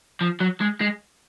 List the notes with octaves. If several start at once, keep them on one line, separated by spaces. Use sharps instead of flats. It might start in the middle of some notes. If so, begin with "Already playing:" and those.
F3
F#3
G#3
G#3